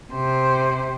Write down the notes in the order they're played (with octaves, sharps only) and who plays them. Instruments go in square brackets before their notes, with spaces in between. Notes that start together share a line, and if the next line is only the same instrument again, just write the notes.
[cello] C3 C5